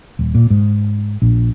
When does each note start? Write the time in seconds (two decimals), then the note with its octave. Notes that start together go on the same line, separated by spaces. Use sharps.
0.19 D#1
0.35 A#2
0.50 G#2
1.22 A#1